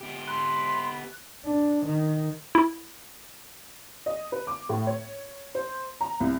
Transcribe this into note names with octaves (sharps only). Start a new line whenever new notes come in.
B3 G4
B5 C6 F#6
D4
D#3
E4
D#5
B4
D6
A2
C#5
C5
A#5
C2